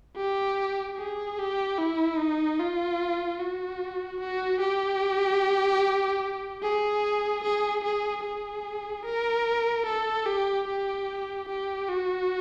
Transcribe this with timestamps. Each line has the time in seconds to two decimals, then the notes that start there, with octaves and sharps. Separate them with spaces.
0.17 G4
0.97 G#4
1.38 G4
1.78 E4
2.19 D#4
2.59 F4
3.40 F#4
4.21 F#4
4.60 G4
6.63 G#4
7.44 G#4
7.84 G#4
8.24 G#4
9.05 A#4
9.86 A4
10.26 G4
10.68 G4
11.48 G4
11.89 F#4